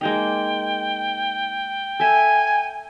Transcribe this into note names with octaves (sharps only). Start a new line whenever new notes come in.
G#3 A#3 D#4 G5
A4 E5 G#5